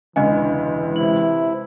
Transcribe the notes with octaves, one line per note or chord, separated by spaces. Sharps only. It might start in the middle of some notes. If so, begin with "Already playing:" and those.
E1 C#2 D3 E3 D#5 G#5
C3 E4 F#7